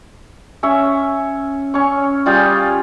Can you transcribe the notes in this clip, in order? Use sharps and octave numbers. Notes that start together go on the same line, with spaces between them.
C#4 C#5 E5
C#4 C#6
G3 F4 G#4 G5